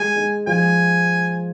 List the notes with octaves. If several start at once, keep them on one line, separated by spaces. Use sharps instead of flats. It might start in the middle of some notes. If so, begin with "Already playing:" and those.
Already playing: G#3 G#5
G#3
F3 G#5